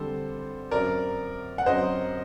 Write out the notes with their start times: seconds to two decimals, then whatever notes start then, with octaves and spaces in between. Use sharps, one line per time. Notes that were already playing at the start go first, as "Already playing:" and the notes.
Already playing: D3 G3 C4 G4 A4 C5
0.71 F#2 F#3 C4 A#4 D5
1.58 F#5
1.66 F#2 F#3 C4 C5 D#5